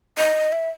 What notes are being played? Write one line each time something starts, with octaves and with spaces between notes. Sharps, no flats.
D#5
E5